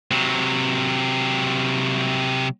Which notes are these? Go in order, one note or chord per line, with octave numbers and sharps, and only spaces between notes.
C3 F#3